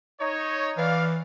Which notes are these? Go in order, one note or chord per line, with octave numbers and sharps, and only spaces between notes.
D#4 C#5
E3 D5 F5